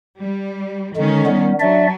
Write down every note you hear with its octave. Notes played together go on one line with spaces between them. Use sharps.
G3
D3 D#3 G#3 C#4
G3 B3
F#3 D4 D5 E5